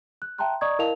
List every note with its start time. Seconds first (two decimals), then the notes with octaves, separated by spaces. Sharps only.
0.22 F#6
0.38 E5 G5 A5 A#5 C6 F#6
0.61 D5 D#5 A#5 C#6 D#6 G#6
0.79 E4 A#4 D#5 F5 A5 F7